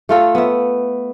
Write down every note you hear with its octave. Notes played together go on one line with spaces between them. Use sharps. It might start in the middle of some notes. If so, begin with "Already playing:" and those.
A3 F4 A4
B3 E5